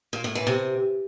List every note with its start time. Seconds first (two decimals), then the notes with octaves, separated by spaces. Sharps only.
0.13 A#2
0.24 A2
0.35 E3
0.47 C3